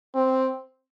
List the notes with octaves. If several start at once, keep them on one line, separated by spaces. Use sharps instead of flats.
C4